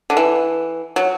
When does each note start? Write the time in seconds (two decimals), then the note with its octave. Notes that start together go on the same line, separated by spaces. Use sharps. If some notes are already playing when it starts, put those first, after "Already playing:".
0.10 D3
0.17 E3
0.96 F#3